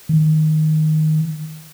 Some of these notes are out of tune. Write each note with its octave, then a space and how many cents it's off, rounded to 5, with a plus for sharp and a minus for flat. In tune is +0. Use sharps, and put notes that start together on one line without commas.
D#3 +0